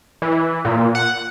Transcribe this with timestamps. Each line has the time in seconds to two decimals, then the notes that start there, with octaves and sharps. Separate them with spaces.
0.22 E3
0.65 A#2
0.95 F#5